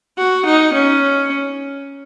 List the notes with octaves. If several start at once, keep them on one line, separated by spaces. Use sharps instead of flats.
F#4
D#4
C#4